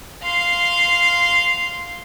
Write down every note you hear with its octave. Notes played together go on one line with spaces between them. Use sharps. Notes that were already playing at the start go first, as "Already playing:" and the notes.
F5 C6